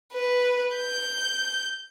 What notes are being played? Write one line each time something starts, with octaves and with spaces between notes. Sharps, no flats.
B4
G6